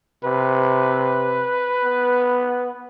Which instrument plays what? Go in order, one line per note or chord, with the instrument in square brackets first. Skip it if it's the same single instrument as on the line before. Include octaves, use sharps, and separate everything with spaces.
[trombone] C3 [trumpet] B4
[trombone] B3